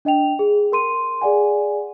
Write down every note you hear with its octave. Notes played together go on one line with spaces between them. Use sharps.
D4 D#5 G5 F7
G#4
A#4 C6 D#7
G#4 D5 F#5 G#5